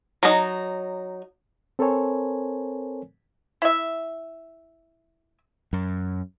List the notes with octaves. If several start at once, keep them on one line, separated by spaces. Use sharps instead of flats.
F#3 D#4
C4 A4 A#4 C5 C#5 G#5
E4 E5
F#2